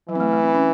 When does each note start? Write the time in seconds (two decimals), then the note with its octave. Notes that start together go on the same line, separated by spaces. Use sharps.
0.09 E3 F#3
0.15 C4
0.20 A3
0.32 A3
0.44 C4
0.55 C#4